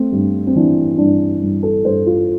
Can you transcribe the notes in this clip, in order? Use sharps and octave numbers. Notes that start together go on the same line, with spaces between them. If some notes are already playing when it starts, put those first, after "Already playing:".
Already playing: A3 C4
G2
C4
E3 D4
G2 D4
G2
A4
G2 C5
F4